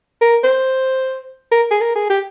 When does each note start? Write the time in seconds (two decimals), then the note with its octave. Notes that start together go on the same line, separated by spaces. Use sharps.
0.21 A#4
0.43 C5
1.52 A#4
1.71 G#4
1.81 A#4
1.96 G#4
2.10 G4